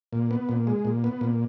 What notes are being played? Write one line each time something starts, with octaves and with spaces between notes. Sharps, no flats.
A#2
B3
A#2
G#3
A#2
B3
A#2